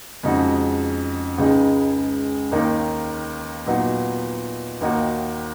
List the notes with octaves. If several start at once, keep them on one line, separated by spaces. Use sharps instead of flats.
F2 C#3 G#3 D#4 F#4
C#2 C#3 G#3 D#4 G#4
D#2 D#3 A#3 D#4
A#2 F#3 B3 D#4 F#4
D#2 D#3 A#3 D#4 F#4